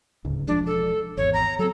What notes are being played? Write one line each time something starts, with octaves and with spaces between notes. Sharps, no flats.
D1 C#2 G#2
E1 F3 G#3 D4
A4
G#1 E2 C#5
A#5
F#3 C4 A4